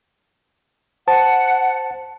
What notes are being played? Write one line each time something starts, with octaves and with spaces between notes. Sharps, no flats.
C5 F#5 A5